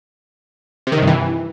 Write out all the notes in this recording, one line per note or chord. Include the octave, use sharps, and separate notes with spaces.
C3
D#3
C3
G2
E3